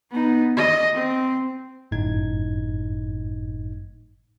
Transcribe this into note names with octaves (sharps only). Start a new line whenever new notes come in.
B3 D#4
D#5
C4
G1 F#2 A2 D#4 G#6